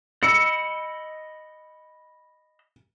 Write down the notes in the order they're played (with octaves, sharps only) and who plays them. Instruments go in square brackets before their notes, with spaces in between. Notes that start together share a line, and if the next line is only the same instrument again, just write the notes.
[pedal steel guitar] D#5 B5 E6 [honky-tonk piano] C#7